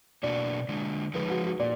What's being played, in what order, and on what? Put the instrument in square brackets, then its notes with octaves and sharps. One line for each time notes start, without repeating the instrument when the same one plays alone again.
[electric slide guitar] B2 A#3 D4 F#4 [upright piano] D5
[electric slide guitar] D3 G#3 D4
[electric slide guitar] F3 G#3 D#4 [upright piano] B4
[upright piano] F#4
F#4
[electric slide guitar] A#2 [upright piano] D5